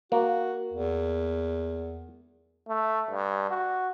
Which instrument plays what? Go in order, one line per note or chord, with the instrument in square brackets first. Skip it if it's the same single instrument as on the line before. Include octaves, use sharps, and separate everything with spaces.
[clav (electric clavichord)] A#3 [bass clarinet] F#4
[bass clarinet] E2
[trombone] A3
G2
F#4